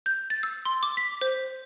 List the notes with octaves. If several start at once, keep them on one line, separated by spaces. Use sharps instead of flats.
G6
A6
E6
C6
D6
B6
C5